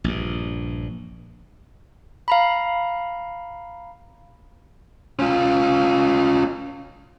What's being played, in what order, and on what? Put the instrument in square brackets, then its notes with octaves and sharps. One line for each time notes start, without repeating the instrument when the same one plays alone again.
[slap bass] A#1 G2
[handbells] F5 A#5 B5
[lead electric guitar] C#4 F4